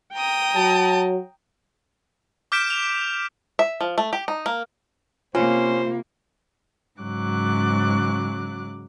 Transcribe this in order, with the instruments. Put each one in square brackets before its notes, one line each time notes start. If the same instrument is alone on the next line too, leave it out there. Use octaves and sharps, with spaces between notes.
[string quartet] G5 A#5 D#6
[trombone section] F#3 [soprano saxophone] A5
[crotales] D6 F6 G6 B6 D7 E7
F7
[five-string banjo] E5
F3
A3
G4
D#4
A#3
[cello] C3 A#3 [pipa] C#4 [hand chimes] F4 [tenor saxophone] C5
[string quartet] G#2 C#3 F#3 D6 F#6